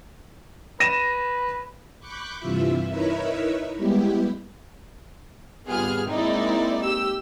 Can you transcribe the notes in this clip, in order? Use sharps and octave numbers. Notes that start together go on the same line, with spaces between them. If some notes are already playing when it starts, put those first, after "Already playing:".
B4 A#6 D#7 E7
B5 C#6 D6 F#6 G6
G2 C3 E3 F4 E5
D#4 E4 A#4 B4 C#5 E5
G3 G#3 B3 E4 G4
G#1 G3 B3 F4 G#4 F6
G#3 A#3 C4 D#4 E4 D5
G4 E6